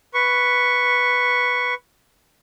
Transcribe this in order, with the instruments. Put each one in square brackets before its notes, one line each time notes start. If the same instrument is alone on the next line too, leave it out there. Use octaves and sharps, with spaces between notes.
[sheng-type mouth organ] B4 C#6